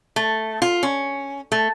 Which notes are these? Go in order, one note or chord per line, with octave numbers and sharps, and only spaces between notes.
A3
F4
C#4
A3